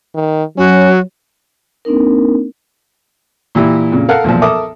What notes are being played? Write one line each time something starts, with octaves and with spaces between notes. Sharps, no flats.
D#3
F#3 C#4 F#4
A#3 C4 D4 D#4 A#4
A#2 E3 E4 G4
F2 A#2 C#3
A4 A#4 F5 F#5
B1 E2 A#2 F3
A4 A#4 E5 D6 D#6